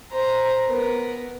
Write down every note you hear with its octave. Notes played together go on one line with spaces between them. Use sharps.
C5 A#5
B3 A#4